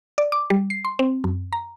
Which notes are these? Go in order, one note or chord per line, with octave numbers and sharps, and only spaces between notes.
D5
D6
G3
C7
C6
C4
F#2
A#5